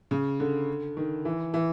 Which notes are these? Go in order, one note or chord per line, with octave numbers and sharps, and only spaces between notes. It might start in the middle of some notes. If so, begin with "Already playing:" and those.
C#3
D3
D#3
E3
E3